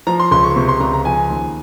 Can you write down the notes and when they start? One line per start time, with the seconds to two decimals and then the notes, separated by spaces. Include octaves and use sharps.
0.07 F3 A#5
0.20 C6
0.31 C#2 C6
0.44 C#6
0.56 C3 C#6
0.68 C6
0.80 C#2 A#5
0.93 A#5
1.05 F3 G#5
1.30 D#2